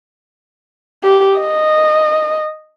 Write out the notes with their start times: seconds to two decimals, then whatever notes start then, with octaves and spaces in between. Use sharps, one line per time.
1.04 G4
1.38 D#5